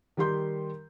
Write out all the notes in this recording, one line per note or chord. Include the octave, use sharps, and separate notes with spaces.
D#3 G3 G4 C6 G6